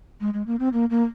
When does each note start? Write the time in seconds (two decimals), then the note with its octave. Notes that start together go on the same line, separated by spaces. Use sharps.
0.21 G#3
0.34 G#3
0.47 A#3
0.60 C4
0.73 A#3
0.90 A#3